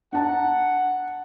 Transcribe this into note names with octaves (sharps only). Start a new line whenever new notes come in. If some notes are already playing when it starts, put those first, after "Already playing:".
D4 F#5 A5 A#5